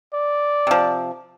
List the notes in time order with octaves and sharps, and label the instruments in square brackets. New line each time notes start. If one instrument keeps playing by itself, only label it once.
[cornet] D5
[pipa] C3 F3